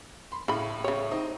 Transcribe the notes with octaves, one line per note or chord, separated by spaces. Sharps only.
B5 C6
A2 C#3 B5
C#3 C#5
C4 D#4